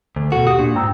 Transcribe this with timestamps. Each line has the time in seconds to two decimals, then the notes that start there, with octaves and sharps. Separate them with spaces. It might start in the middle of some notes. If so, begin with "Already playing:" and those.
0.16 D2
0.32 B2 F#4 A4
0.47 D#2 F#4 G4 D#6
0.59 A#2 D4
0.75 G#2 G5 A#5 E6